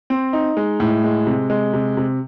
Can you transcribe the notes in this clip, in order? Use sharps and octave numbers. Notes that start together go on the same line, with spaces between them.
C4
D#4
G#3
A2
G#3
C3
G#3
C3
C3